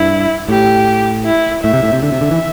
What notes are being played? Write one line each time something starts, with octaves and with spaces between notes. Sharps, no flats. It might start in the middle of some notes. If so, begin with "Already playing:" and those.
Already playing: G2 E4
A2 G4
E4
A2 E5
C3
A2
C3
D3 E5
C3
D3
E3